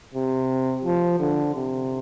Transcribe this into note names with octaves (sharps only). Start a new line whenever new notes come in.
C3
F3
D3
C3